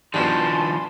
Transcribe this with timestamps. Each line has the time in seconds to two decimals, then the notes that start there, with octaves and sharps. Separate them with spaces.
0.14 G2 B2 D#3 F3 G#5 A5 B5 C6